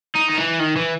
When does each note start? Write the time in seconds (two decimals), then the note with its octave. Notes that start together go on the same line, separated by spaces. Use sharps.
0.15 D#4
0.30 D#3
0.37 E3
0.59 D#3
0.76 E3